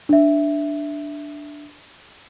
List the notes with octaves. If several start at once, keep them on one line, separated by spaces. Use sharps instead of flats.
D4 E5